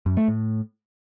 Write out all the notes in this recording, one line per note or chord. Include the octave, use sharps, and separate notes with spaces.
F#2
A3
A2